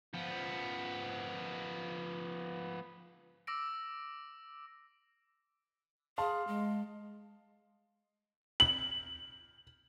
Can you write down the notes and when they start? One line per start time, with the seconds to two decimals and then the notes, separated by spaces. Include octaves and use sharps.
0.14 F3 B3
3.47 D6 E6 A#6 D7
6.18 G#4 F5 A5 C6
6.48 G#3
8.60 F#7